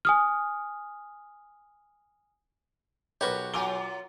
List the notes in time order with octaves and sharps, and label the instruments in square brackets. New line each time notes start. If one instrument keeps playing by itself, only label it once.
[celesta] G#5 D#6 F6
[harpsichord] B1 F#4 G4 [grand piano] A#4 B4 C#5
[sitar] F#3 F4 A#4 [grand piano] G#5 D6 G7